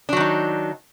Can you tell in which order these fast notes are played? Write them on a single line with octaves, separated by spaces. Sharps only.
D4 F#3 D#3 D#4